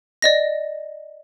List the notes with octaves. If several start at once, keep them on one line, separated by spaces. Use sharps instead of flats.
D5 D#5 A#6